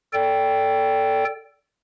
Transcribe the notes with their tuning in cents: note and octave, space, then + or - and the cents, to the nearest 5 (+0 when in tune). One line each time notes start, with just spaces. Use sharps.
A4 +10 D5 -25 G5 +0